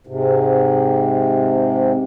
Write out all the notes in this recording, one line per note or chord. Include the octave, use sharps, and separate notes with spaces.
G#2 C3